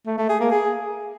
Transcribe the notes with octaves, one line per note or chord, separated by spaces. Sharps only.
A3
A3
G#4
A#3
G#4